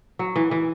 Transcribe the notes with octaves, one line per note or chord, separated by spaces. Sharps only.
F#3
E3
E3